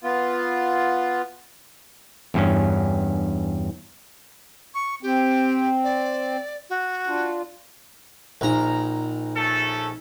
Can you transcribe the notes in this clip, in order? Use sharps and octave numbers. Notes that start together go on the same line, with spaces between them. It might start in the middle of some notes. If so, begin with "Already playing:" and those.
B3 F4
E2 G2 C#4
C#6
C4 G4
D5
F#4
D4 F4
A#1 D#4 A#4 A#5
A3 C#4 A4